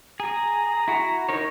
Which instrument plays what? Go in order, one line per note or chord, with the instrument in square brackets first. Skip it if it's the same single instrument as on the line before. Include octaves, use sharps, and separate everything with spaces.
[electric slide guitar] G#4 [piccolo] A#5
[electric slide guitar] E4 F#4
D#4 A#4 C#5